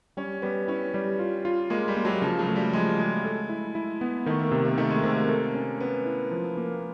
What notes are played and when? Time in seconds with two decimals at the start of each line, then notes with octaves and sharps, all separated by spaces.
0.17 G3 C#4
0.42 G3 B3
0.68 C#4 E4
0.94 G3
1.19 F4
1.45 F4
1.70 G#3 A#3
1.88 G3
1.97 A#3
2.05 F#3
2.22 C#3 F3
2.39 F#3
2.47 A3
2.56 G3
2.73 F3 G#3
2.99 G#3 A3
3.25 A4
3.49 E4
3.75 E4
4.01 B3
4.26 D#3 A3
4.39 A#3
4.52 C3
4.65 A#3
4.78 D#3 A3
4.90 G#3
5.03 C3 A#3
5.16 A#3
5.29 A4
5.55 C#4
5.80 B3 C#4
6.06 E4
6.31 F3
6.57 A#3